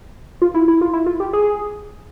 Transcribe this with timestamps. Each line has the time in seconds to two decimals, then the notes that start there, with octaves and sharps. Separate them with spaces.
0.42 F4
0.54 E4
0.68 E4
0.81 F4
0.93 E4
1.06 F4
1.20 G4
1.33 G#4